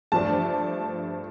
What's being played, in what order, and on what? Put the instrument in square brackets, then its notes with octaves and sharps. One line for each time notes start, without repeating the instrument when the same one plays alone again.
[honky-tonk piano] G2 F3 A3 D4 A5